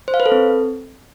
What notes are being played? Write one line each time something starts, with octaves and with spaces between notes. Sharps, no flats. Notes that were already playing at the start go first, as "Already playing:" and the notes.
C5
F5
B4
A4
C4